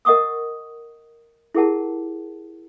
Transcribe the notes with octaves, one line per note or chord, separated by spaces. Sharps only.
A#4 D#5 F#5 C#6 D#6 E6
E4 G4 G#4 A#4 F#5 A5